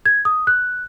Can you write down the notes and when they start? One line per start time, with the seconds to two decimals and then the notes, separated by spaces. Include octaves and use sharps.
0.06 G#6
0.25 D#6
0.47 F#6